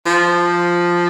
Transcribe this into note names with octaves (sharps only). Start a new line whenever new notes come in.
F3